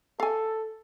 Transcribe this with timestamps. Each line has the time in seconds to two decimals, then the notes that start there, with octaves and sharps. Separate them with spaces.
0.20 A4 F5 G#5